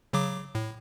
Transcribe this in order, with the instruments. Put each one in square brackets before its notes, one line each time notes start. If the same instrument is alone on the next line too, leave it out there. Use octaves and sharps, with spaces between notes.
[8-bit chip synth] C#3 F#3 D6
A2